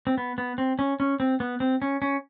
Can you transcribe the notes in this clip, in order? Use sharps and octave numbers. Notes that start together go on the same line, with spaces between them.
C4
B3
B3
C4
C#4
C#4
C4
B3
C4
C#4
C#4